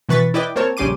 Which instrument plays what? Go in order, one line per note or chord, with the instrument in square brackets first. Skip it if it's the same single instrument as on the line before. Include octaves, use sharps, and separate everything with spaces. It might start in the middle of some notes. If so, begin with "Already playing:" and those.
[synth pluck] B2 E3 B4 C#6 A6 B6
E4 B4 D5 D#5 G5 D6
A#3 C4 A#4 C#5 A5
A#1 C#3 G3 C6 D6 D#7